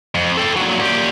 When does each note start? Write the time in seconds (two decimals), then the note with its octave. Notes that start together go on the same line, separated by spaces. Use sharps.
0.15 F2
0.37 A4 G5
0.56 A#2 F#3
0.79 A#2 G4